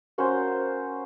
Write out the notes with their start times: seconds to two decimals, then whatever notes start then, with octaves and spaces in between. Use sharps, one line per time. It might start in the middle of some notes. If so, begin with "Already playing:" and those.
0.18 A#3 C#4 F#4 C5